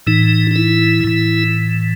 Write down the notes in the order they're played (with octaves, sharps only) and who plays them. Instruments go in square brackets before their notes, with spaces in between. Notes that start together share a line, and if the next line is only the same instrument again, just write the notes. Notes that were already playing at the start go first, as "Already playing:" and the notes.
[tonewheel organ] A2 E3 D#4
D#4
E4
A2 E3